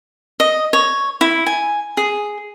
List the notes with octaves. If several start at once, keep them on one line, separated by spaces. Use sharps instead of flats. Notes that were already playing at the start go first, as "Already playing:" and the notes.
D#5
C#5
E4
G#5
G#4